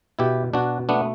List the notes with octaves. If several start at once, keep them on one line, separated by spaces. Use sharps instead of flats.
B2 E4 G4
B2 D4 F#4
A3 B3 D4